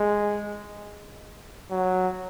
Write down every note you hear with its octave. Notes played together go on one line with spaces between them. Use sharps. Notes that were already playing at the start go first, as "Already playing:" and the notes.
Already playing: G#3
F#3